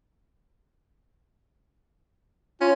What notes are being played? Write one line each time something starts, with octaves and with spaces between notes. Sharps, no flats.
C#4 F4